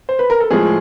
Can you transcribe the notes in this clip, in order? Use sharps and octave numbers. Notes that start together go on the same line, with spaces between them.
C5
B4
A#4
A4
A2 F3 G#3 G#4